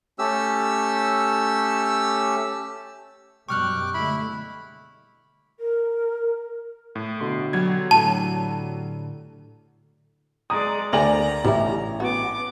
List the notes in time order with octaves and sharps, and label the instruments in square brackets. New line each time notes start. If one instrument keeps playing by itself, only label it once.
[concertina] A3 C#4 G4 E6
[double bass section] F#2 B2 G3 [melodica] G5 D6 [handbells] C#6 F6 F#6
[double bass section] D3 G#3 A3 [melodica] E4 B5
[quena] A#4
[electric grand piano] A2
[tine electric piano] B2 D3 C6
[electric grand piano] F#3 G3 G#6
[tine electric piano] A2 D3 [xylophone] A5
[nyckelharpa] G#3 D5 [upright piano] A#5 D#6
[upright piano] D2 D5 F#7 [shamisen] A#4 C5 G#5 [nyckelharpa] A#5
[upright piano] A1 [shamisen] G3 C#4 E4
[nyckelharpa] B3 D6 [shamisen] F#4